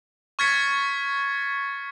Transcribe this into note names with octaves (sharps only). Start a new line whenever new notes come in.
C#6 F6 G#6 A6 B6 C#7